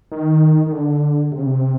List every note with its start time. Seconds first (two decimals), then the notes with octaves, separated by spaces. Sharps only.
0.12 D#3
0.66 D#3
0.72 D3
1.32 C3
1.40 C#3
1.46 C3